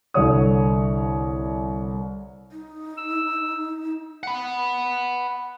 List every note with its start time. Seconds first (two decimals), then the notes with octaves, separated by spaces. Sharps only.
0.14 C2 D3 C#5 D#6
2.52 D#4
2.98 E6
4.23 F#5 B5